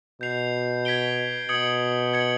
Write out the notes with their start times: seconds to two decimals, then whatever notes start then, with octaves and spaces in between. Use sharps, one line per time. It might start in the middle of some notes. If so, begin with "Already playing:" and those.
0.21 B2 G6 C7 F7
0.85 G#6 B6 D7 G7
1.49 B2 D#6 G#6 C#7 F#7
2.13 G#6 C#7 F#7